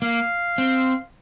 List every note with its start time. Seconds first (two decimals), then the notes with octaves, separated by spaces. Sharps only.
0.02 A#3 F5
0.58 C4